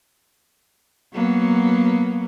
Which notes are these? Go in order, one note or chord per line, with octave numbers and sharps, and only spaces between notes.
F#3 A#3 B3